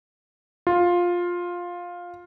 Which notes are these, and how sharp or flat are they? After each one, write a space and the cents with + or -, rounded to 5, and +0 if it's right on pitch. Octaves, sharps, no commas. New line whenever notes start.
F4 +10